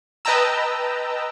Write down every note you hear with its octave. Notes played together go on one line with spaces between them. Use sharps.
B4 D#5 G5 A5 A#5 E6